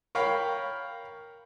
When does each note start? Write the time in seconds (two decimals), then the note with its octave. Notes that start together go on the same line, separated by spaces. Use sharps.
0.15 A#4 C#5 F5 G5 B5